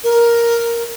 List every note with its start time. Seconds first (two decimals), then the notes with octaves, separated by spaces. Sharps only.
0.04 A#4